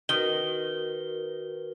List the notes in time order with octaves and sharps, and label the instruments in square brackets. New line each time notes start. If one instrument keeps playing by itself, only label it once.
[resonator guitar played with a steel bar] D#3 [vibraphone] F#4 A#4 B4 [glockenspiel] G7